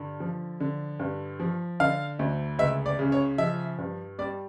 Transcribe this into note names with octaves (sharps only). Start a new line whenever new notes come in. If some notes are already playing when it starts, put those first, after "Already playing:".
Already playing: G2 D3
F3
D3
G2
F3
D3 F5
D2
C#2 E5
D5
C#3
C#5
F3 E5
G2
G3 D5